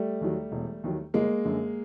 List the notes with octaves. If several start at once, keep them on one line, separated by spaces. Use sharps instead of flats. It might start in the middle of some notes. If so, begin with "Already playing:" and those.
Already playing: G3 A3
D#2 D#3 F#3
E1
D#2 D#3 F#3
G1 G#3 A#3
F#2 D3